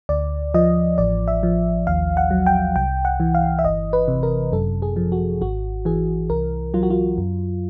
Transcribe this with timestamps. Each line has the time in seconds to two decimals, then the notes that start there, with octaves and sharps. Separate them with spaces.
0.09 D2 D5
0.54 F3 D#5
0.98 A1 D5
1.28 E5
1.43 F3
1.87 D#2 F5
2.17 F#5
2.31 F#3
2.46 G5
2.76 C2 G5
3.05 F#5
3.20 E3
3.35 F5
3.59 E5
3.64 G1 D#5
3.93 B4
4.08 C3
4.23 A#4
4.52 F#2 A4
4.82 G#4
4.96 F3
5.12 F#4
5.41 G#1 F#4
5.85 E3 G#4
6.30 C2 A#4
6.74 F#3 F4
6.83 F#4
6.90 F4
7.18 F#2